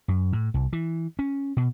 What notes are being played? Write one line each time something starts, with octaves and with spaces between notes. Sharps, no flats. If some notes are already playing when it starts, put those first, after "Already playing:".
F#2
A2
C2
E3
C#4
B2